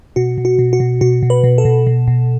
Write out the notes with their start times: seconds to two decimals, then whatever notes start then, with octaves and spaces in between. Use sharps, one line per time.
0.16 B2 F#4
0.38 B2
0.45 F#4
0.59 B2
0.73 F#4
0.80 B2
1.01 B2 F#4
1.23 B2
1.30 B4
1.44 B2
1.58 A4
1.65 B2
1.87 B2
2.08 B2